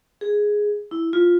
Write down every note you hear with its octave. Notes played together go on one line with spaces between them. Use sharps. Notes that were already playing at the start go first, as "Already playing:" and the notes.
G#4
E4
F4